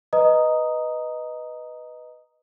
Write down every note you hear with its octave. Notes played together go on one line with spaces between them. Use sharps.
B4 D#5 A#5 D#6